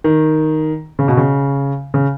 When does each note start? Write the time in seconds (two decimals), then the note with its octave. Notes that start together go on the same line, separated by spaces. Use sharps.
0.04 D#3
0.99 C#3
1.08 B2
1.17 C#3
1.94 C#3